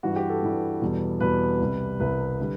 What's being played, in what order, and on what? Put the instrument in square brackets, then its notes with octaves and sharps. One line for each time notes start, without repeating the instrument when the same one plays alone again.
[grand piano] G2 E3 G3 F#4
G4
A4
G2 E3 G3
E2 B2 G3
E2 B2 G3 B4
C2 C3 G3
C2 C3 G3 B4
D3 G3